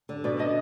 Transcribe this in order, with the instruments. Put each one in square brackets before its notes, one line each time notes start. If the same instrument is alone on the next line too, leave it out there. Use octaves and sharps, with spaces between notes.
[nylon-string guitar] D3
[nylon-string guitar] B2 [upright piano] D5
[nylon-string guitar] D4 [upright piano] D#5